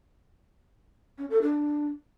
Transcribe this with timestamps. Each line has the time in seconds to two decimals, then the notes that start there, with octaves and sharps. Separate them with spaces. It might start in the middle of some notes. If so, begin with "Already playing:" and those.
1.18 C#4
1.30 A4
1.42 D4